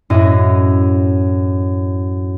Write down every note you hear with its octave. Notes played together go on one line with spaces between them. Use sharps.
F#2 A2 E4 D#5